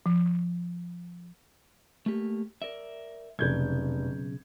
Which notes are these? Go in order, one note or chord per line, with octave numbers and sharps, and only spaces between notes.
F3
A3 A#3 G4
A#4 D5 E5
F1 B1 C#3 G6 G#6